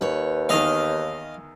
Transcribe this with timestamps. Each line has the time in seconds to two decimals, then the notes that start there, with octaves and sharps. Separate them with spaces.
0.01 D#2 B4 C#5
0.49 E2 D#3 D#5 F5